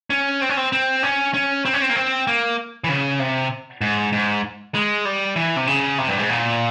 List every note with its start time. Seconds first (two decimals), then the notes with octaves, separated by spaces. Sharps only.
0.10 C#4
0.42 C4
0.49 C#4
0.57 C4
0.72 C4
1.03 C#4
1.34 C#4
1.65 C4
1.74 C#4
1.82 C4
1.90 A#3
1.96 C4
2.27 A#3
2.84 E3
2.89 C#3
3.19 C3
3.81 G#2
4.13 G#2
4.75 G#3
5.05 G3
5.36 E3
5.56 C3
5.67 C#3
5.98 C3
6.08 G2
6.19 G#2
6.29 A#2